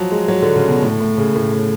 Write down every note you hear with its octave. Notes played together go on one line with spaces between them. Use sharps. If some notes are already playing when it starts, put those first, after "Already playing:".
Already playing: F3 F#3
G#3
F#3
D3
C#3
B2
A2
A2
C#3
A2
A2